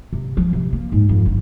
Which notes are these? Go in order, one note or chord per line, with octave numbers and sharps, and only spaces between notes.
C3
F3
C3
A#3
G#2
F2
G1